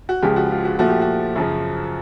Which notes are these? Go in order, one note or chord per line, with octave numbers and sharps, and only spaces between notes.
F#4
C#2 C#3 F3 G#3 G4
F#4
F4
F#4
A#2 F3 A3 F#4
G4
F#4
F#2 C#3 F3